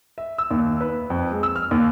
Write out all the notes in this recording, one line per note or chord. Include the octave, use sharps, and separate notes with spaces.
E5
E6
D#2
B4
F2
G#3
E6
F6
D#2